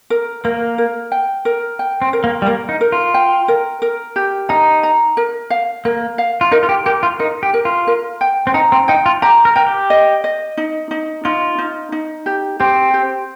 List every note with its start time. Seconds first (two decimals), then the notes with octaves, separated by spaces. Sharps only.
0.10 A#4
0.44 A#3 A#4
0.78 A#4
1.12 G5
1.45 A#4
1.79 G5
2.02 C4
2.13 A#4
2.24 A#3
2.42 G3
2.46 A#3 A#4
2.69 D#4
2.81 A#4
2.92 F4
3.14 G5
3.48 A#4
3.82 A#4
4.16 G4
4.49 D#4 A#5
4.83 A#5
5.17 A#4
5.50 F5
5.85 A#3 A#4
6.18 F5
6.41 F4
6.51 D#4 A#4
6.63 F4
6.69 G4
6.86 G4 A#4
7.03 F4
7.19 D#4 A#4
7.43 G4
7.54 A#4
7.65 F4
7.87 A#4
8.21 G5
8.47 C4
8.54 D#4 A#5
8.72 C4
8.88 D#4 G5
9.06 F4
9.22 G4 A#5
9.45 A#4
9.56 A#4 G5
9.67 G4
9.90 D#5
10.24 D#5
10.57 D#4
10.91 D#4
11.25 D#4 F4
11.58 D#4
11.92 D#4
12.26 G4
12.60 C4 G4
12.94 G4